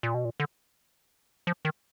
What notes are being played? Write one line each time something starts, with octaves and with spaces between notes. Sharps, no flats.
A#2
B2
A#2
D3
F3
D#3